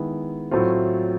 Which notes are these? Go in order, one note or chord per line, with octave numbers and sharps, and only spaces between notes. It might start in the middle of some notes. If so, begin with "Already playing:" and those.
Already playing: D#3 G#3 B3 E4
A2 F#3 A3 C4 F4